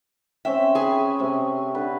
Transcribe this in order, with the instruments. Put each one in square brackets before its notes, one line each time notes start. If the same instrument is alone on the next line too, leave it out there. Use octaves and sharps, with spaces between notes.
[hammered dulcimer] C4 C#4 G5 [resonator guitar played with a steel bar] E5
[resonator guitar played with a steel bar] G#4 [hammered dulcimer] B4
[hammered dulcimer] C3 A3
D3 B4